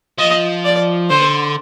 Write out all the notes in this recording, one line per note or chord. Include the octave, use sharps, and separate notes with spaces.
F3 D#5
D5
D3 C5